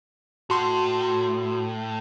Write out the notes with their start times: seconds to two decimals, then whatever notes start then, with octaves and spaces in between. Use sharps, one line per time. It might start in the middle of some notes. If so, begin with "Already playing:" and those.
0.50 A2 F#4 C6